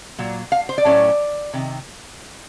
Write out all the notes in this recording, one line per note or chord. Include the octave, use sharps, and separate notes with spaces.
A#2 F#3
F5
C5
D5
A2 F#3 A3 C#4
C3 D#3